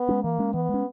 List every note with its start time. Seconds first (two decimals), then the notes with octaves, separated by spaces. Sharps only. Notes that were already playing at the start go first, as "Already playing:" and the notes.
Already playing: B3
0.09 G#3 C#4
0.23 E3 A#3
0.39 G#3 C#4
0.54 E3 B3
0.69 G#3 C#4